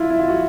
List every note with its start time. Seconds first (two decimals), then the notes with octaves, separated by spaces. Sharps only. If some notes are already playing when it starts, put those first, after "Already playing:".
Already playing: E4 F4
0.10 E4
0.19 F4
0.28 F#4